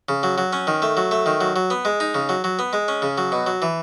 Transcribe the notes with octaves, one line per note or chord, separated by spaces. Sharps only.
C#3
F#3
F#3
C#4
D#3
A3
F#3
A3
D#3
F#3
F#3
B3
G#3
D#4
C#3
F#3
F#3
B3
G#3
C#4
C#3
F#3
B2
F#3
E3